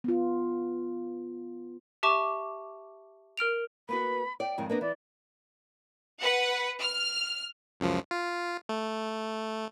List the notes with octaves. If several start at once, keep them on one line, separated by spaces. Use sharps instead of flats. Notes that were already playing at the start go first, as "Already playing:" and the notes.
B3 F4
G4 E5 A5 C#6 D6
A#4 F6 D7 F7
A#3 B3 F#4 B5
D5 G5
F2 G#2 D#3
A#3 B3 D4 D#5
E3 D5
B4 F#5
F6
C#2 F#2 F3
F4
A3